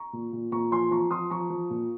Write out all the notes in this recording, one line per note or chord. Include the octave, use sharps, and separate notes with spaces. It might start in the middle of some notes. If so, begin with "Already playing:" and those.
Already playing: A#5 C#6
A#2
A#2
A#2 A#5 C#6
F3 G#5 C6
F3 A#5 C#6
F3 C6 D#6
F3 A#5 C#6
F3
A#2